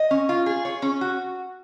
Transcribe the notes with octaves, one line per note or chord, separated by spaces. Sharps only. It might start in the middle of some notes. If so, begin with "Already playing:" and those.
Already playing: D#5
C#4
F4
G#4
C#5
C#4
F#4